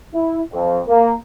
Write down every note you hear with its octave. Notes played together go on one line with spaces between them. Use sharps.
E4
F2
A#3